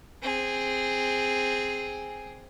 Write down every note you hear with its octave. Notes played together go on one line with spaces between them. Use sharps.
C4 G#4